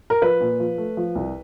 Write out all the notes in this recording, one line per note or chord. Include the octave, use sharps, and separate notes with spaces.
A#4
F3 B4
A#2
F3
A3
F3
C2